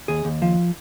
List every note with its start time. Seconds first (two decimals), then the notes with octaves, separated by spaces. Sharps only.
0.08 D#2 G#4
0.25 D#2
0.42 F3